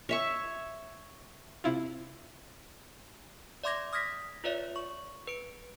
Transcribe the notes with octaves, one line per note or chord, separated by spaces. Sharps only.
C#5 E5 C#6
C3 E4 F4
D5 E5 C6 D6 G#6 A#6
D#6 F6 G#6 A#6 B6
F4 B4 C#5 D5 E5
C#6
B4 D7